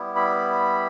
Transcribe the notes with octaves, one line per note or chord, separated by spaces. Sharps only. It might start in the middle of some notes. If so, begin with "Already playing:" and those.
Already playing: G3 B3 E4
B5